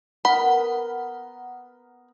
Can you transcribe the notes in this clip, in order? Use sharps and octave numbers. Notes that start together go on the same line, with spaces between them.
B3 A#4 F#5 B5